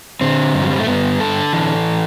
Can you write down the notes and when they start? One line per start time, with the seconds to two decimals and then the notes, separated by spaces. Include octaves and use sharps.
0.21 D3 C4
0.54 G2
0.62 F#3
0.71 G3
0.79 A3
0.87 G2 B3
1.20 D3 A4
1.53 E3